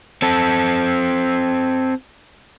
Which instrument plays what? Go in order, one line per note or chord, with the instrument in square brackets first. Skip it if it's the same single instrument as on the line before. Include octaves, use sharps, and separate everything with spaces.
[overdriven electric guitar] C4 A4